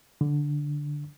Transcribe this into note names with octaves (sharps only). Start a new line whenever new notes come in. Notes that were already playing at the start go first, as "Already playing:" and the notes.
D3